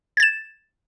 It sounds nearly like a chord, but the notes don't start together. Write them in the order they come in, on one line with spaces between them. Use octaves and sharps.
G#6 A6 E7